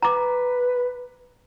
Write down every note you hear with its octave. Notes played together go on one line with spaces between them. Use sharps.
B4 A#5 D6